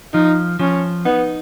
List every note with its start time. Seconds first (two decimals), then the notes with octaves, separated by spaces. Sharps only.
0.13 F3 D#4
0.59 F3 C#4
1.05 B3 D#4